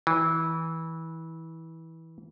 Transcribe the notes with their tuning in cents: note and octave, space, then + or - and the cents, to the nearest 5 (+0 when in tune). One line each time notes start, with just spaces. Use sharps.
E3 -20